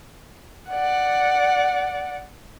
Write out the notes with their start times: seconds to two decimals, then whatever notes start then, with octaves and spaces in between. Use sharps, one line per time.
0.70 D5 F#5